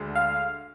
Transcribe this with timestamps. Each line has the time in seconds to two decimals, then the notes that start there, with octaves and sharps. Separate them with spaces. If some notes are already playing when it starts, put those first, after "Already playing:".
Already playing: D2 D3 G#3
0.15 F5